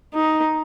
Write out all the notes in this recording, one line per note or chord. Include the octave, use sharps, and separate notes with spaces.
D#4